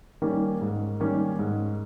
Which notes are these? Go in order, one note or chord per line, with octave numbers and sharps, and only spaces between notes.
D#3 G3 A#3 C#4
G#2
D#3 G3 A#3 C#4
G#2